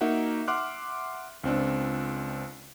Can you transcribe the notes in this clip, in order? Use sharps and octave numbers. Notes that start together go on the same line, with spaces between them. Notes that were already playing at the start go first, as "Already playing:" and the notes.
A#3 D#4 F#4 E5 F#5
E5 F#5 C6 D6 F6 F#6
C#2 C4 D4